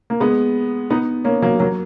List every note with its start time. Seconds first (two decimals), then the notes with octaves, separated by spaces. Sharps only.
0.10 A#3
0.20 G#3 B3
0.90 B3 D#4
1.24 A#3 C#4
1.42 F#3 A#3
1.60 F#3 A#3